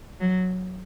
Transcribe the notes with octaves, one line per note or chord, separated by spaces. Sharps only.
F#3